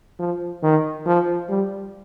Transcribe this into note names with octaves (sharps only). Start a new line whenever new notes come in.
F3
D#3
F3
G3